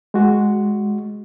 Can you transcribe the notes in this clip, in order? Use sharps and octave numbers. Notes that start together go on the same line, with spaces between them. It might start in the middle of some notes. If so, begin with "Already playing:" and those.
G#3 F#4